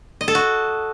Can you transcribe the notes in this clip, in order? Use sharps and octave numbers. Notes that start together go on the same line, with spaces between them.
D#5
A4
F#4